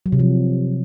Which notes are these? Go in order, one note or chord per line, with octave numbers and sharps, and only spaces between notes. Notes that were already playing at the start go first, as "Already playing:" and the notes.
F#3
C3
F3